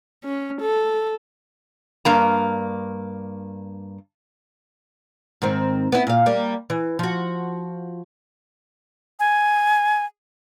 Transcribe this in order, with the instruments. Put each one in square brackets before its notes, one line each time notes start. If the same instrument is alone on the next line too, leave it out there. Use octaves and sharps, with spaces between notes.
[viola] C#4
A4
[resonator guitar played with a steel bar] G2 A#3 A#5
[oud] G#2 D#3 C4
B3 E4
A#2 F5
G3 A#3
E3
F3 F#4
[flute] G#5